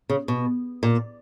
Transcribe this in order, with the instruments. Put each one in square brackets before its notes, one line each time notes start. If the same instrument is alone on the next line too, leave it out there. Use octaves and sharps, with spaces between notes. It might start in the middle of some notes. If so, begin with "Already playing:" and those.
[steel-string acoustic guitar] C#3
B2
A#2